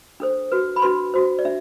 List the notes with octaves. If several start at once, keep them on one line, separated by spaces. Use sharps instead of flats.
D4 A4 C5
F#4 B4
B5
D4 F#4 B4 C6
F#4 C5
D5
D4 E5